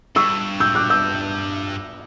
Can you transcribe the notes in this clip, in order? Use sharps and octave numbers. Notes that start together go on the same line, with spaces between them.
G2 C#6 E6
E6 G6
D6 F#6
E6 G6